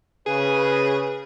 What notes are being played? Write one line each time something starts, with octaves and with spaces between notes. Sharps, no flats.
C#3 G#4 B4